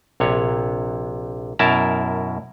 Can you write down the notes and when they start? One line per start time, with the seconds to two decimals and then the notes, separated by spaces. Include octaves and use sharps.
0.20 A#1 C3 C#5
1.59 F#2 B2 E4 A#4 A5 A#5